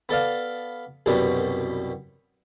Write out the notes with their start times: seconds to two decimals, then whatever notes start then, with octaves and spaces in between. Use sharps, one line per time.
0.09 B3 A4 D5 F5
1.06 C2 F#2 B2 G3 B3